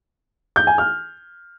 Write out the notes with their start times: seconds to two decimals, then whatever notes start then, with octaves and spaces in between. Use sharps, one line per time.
0.56 G6
0.67 G#5
0.78 F6